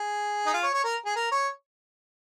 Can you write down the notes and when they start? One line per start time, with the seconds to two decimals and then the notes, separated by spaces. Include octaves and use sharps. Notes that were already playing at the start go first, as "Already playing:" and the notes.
Already playing: G#4
0.46 D#4
0.53 F4
0.63 C#5
0.74 C#5
0.84 A#4
1.06 G#4
1.16 A#4
1.31 C#5